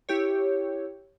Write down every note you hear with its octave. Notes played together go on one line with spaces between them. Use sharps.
E4 G4 C#5